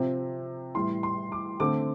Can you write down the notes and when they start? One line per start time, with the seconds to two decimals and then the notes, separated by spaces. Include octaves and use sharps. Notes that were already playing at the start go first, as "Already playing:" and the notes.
Already playing: C3 F3 C4
0.75 A2 E3 G3 C6
1.03 C6
1.32 D6
1.60 D3 A3 C4 D6